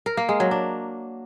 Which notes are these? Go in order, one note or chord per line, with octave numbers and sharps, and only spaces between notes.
A#4
A#3
G#3
F#3
D4